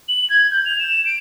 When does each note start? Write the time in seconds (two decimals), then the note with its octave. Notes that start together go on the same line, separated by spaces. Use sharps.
0.08 F#7
0.30 G#6
0.51 G6
0.66 F7
0.79 E7
1.05 D7